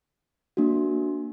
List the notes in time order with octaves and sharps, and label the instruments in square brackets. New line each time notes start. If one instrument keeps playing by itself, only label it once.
[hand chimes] A#3 D4 F#4